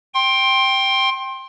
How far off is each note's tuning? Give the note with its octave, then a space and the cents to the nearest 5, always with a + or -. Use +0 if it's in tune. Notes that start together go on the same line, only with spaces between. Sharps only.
G5 +0 C6 +20